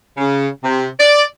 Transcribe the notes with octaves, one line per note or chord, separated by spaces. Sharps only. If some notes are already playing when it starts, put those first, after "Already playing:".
C#3
C3
D5